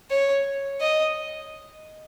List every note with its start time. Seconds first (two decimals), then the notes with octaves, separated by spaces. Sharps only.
0.10 C#5
0.81 D#5